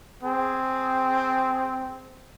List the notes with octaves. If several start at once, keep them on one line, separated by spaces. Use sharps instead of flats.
C4 G#4